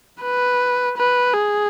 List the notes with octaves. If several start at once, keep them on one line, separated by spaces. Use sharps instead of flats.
B4
B4
G#4